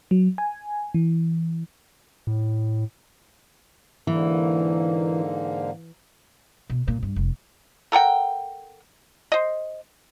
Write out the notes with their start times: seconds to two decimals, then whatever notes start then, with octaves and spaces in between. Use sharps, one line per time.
0.11 F#3
0.38 G#5
0.94 E3
2.27 A2
4.07 G#2 D3 E3 A#3
6.70 B2
6.88 A#2
7.03 G2
7.16 F1
7.92 A4 A#4 F#5 G5
9.32 C5 D#5